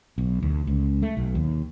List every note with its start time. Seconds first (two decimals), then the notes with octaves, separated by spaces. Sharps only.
0.18 B1
0.42 D2
0.67 C#2
1.02 A3
1.17 B1
1.35 D#2